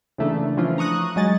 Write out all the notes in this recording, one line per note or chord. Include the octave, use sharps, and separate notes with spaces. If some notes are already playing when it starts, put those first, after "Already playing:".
C#3 E3 A3 A#3 D4
E3 F3 C#4 D4 E4 F4
A#5 C#6 D#6 F#6
F#3 G#3 D#5 G#5 A6